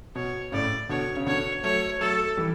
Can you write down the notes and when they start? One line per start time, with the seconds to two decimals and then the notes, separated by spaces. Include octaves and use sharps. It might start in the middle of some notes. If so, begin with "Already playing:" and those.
0.15 B2 C#5
0.52 A2 C#3 D5
0.89 B2 D3 C#5
1.16 C#3
1.26 B2 D3 C#5
1.64 F#3 A3 C#5
2.01 F#3 A3 A4
2.37 E3 G3